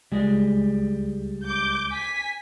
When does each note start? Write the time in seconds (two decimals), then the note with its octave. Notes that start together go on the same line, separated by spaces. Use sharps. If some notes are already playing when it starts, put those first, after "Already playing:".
0.12 C#2 G3 G#3 G#4
1.46 D6 G6
1.93 G#5 B6